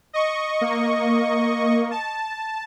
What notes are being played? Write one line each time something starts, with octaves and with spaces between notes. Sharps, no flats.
D#5 C#6
A#3
A5